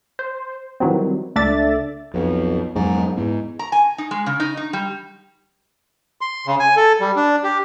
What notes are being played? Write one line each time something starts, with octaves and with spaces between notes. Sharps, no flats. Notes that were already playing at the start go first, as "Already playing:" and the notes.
C5
D#3 E3 F#3 G3 C4
C#2 A3 D4 D5 E5 A6
B1 F2
F2 G#2 F#3 B3
E2 G#2 G#3
A#5
G#5
D#4
G#3
C#3
D#4
D#4
G3
C6
C#3
G#5
A4
G3
D4
G4